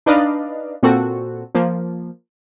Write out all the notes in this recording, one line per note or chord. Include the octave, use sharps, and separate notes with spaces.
D4 D#4 B4 D5 D#5 F5
A#2 C4 F#4 A4
F3 A#3